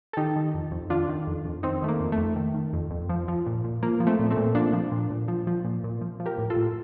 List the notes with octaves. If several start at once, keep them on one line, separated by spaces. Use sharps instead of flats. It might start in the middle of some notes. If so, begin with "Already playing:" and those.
A4
D#3 D#4 G4
D#3
F2
F2
D#3 D4 F4
D#3
F2
F2
D#3 C4 D#4
D#3 A3
A#3
F2
A3
F2
D#3
D#3
F2
F2
F3
F3
A#2
A#2
F3 A#3
F3
A3 C4
A#2
A3 C4
A#2
F3 A#3 D4
F3
A#2
A#2
F3
F3
A#2
A#2
F3
F3
G4 A#4
A2
F4 A4
A2